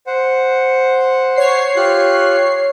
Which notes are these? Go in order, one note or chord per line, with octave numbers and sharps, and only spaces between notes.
C5 F#5
C#5 C7
F4 G4 F#6